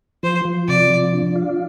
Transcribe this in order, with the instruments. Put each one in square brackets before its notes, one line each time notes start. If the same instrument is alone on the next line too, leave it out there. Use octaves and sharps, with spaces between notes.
[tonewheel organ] F3 [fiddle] C5
[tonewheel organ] F3
[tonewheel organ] C3 [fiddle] D5
[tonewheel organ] F3
D4
F4